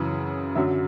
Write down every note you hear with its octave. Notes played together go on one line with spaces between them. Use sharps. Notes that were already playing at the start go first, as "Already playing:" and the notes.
Already playing: F#2 C#3 E3
F#2 D3 F#3 E5